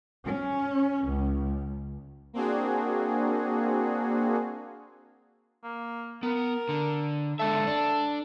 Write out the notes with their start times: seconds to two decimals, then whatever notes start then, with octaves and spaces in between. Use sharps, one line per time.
0.23 C#4
1.07 C#2
2.33 A#3 C4 D4 F#4 G#4
5.64 A#3
6.23 B3 A#4
6.69 D3
7.39 D3 G#3 A4 E5
7.67 D4